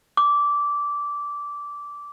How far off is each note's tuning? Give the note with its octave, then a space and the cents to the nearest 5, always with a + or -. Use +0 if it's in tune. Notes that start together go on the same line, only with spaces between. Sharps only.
D6 -15